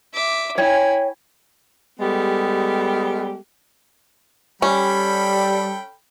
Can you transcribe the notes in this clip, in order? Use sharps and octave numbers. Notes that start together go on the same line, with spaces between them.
E5 D6
E4 C#5 G5 G#5
G3 G#3 B3 G4 A4
G3 C#4 A4 G5 B5